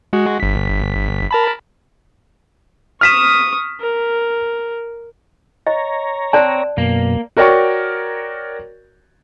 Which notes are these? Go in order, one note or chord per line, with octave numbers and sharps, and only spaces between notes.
G#3 F#4
G1 B6
A#4 A5 B5
C#6 D#6 F6 B6 E7
A#4
C#5 D#5 A#5
C4 C5 D5 A5
F#2 B2 A#3
F#4 A#4 C#5 D5 G5 C#6